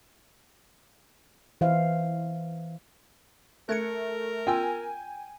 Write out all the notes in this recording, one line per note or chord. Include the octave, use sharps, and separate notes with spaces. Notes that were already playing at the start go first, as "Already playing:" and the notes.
E3 C5 E5 F5
A3 A#4 F#6 G#6 C#7
B3 F4 G5 G#5 E6